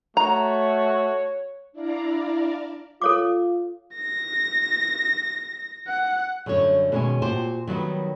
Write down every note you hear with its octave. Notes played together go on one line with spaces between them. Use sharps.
A3 F#4 C#5 A#5
D4 E4 D5 F5 A#5
F4 A4 C#5 D6
A#6
F#5
F#2 D3 G3 C#5
B2 D#3 G#3 C#4 C#5 G#5
A#2 F#4 G4 C5 A5
D#3 F#3 G3 B3